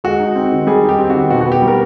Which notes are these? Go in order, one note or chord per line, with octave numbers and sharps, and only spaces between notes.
G#3 F#4
D#4
C4
D#3
G3 G#4
D#4
G4
C4
D#3 F#4
B2 F#4
B3 F#4
G4
G3
A#4